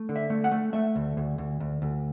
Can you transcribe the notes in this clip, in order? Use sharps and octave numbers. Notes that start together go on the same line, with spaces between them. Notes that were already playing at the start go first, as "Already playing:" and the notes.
Already playing: A3
D3
E5
A3
F#5
A3
A3 E5
D2
D2
D2
D2
D2